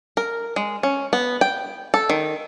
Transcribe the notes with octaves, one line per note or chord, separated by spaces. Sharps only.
A#4
G#3
C#4
B3
G5
A4
D#3